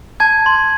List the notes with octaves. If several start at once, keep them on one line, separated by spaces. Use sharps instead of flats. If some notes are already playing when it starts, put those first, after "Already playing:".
A5 G#6
C6